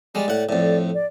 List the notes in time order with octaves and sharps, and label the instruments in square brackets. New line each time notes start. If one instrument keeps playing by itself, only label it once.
[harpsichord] G3 G#3 [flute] D5
[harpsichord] A2 F#5
[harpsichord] F2 A2 [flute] D5
[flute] D5